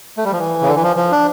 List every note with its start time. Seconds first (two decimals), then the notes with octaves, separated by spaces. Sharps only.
0.17 A3
0.25 G3
0.32 F3
0.39 E3
0.61 C#3
0.68 D3
0.76 E3
0.83 F3
0.97 F3
1.12 D4